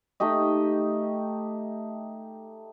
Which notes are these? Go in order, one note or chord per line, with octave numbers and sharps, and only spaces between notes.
A3 D#4 G4 D#5